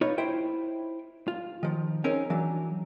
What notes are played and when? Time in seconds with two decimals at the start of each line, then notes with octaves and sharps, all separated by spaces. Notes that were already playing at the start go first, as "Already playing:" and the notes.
0.01 D#4 F4 B4 C#5
0.18 E4 C5 G5
1.28 F4
1.63 D#3 F3
2.04 C4 C#4 D#4 G#4 A#4
2.30 E3 F#3 D4